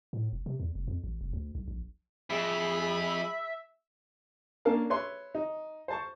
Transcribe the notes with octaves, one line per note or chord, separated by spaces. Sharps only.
A2
E1
C3
E2
F1
F2
A1
F1
D2
B1
A#1
F2 G#4 E5 B5
A#3 C#4 D4 A#4 F5 A5
B4 C#5 E5 C6
D#4
C5 A5 C#6